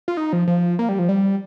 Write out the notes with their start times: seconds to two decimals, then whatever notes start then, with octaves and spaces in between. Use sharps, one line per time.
0.08 F4
0.17 D#4
0.33 F3
0.47 F3
0.79 A#3
0.89 G3
0.99 F3
1.09 G3